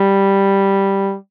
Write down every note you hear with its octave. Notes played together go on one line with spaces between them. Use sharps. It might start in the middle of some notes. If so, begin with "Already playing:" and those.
Already playing: G3